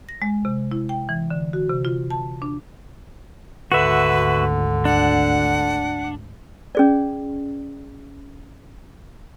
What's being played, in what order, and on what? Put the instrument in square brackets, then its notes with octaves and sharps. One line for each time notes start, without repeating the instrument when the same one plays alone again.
[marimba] A#6
G#3
C3
E4
G5
E3
D3
F#4
C3
F4
A5
D4
[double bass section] G#1 D2 [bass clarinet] D3 [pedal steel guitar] F#4 E5 [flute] B4
[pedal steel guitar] D4 [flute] F#5
[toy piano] C#4 G#4 D5